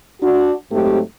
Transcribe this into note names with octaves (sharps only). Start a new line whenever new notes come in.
D4 F#4
G#2 F#3 A3 C4 D#4 G4